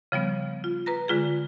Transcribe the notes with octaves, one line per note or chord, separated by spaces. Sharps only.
C#3 F3 G3 B3
F4
B4 A#5 A#6
D3 G#3 F4 G#4